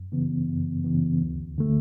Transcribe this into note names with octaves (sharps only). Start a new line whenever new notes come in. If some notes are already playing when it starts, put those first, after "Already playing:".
Already playing: F#2
C#3 E3 B3
F#2
C#3 E3 B3
D2
D3 A3